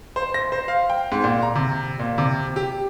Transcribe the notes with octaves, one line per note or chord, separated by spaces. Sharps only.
C5
A#6
C5
F5
G5
G#2
A#2
A#5
C3
A#2
C3
G4